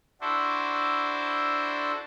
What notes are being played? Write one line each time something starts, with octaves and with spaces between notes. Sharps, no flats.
D4 E4 F#4 A4 C5